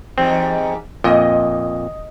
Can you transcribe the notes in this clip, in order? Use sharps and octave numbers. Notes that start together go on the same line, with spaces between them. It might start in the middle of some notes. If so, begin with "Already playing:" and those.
E2 G#2 G3 C4
F2 A#2 D#5